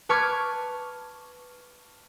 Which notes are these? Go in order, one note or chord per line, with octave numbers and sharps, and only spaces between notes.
B4 A5 C#6 D6 F6 G#6